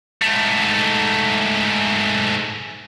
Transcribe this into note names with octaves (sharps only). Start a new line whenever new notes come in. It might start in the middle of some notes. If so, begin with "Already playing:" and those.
G#2 A3